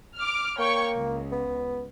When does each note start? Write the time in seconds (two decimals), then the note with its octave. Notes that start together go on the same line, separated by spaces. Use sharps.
0.18 D6 F6
0.59 A#3 C#5 G5 C#6
0.93 C#2
1.32 B3